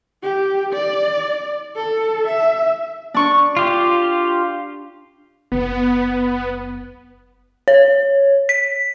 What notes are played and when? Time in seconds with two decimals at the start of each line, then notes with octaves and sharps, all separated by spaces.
0.23 G4
0.73 D5
1.76 A4
2.27 E5
3.14 D4 C#6
3.57 F4 G4
5.52 F#1 B3
7.68 C#5
8.49 B6